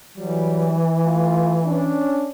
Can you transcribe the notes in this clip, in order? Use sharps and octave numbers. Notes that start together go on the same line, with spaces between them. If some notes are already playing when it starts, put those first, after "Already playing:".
E3 F#3 G3
A3 F4
C#4 D4